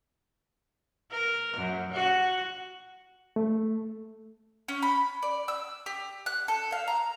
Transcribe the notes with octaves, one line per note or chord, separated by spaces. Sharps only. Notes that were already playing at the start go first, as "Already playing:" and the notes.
A#4
F#2
F#4
A3
C#4
B5
D5
E6
G4
F#6
A4
F5
A#5